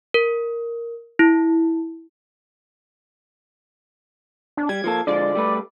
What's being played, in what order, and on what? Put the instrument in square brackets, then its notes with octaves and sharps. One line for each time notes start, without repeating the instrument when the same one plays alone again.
[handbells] A#4
E4
[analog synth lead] D4
[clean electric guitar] G3 [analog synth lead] G#6
[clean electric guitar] F3 A#3 A4
[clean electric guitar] D3 F3 G#3 [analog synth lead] D5
[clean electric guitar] G3 A3 B4